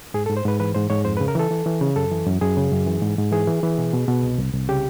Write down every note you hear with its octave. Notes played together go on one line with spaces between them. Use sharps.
G#2 G#4
A4
G#2
C5
G#2 B4
E3 B4
G#2 C5
G#2 C#5
F2 C5
B4
C#3
A#4
E3 A4
E3
E3
C#3
F#2 A4
E3
F#2
F#2 G#4
C#3
F#2
E3
G#2
G#2
E3 G#4
E3
E3
B2
B2
B2
C2
C2
C2
C#3 G4